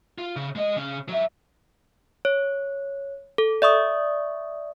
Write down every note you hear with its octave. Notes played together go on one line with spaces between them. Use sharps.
F4
C#3
G#3 D#5
C#3 C#4
F#3 E5
C#5
A4
D5 E5 C#6 D#6